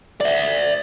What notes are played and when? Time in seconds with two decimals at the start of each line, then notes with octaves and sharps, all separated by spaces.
0.21 D5 E5